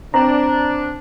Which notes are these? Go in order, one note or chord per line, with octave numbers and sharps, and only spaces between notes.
C4 D4 A#5